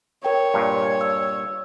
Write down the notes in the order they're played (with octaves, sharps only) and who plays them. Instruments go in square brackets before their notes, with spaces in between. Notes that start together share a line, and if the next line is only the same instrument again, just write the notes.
[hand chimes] A#4 G5 [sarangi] C#5
[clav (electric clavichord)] G2 A#2
[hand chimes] E6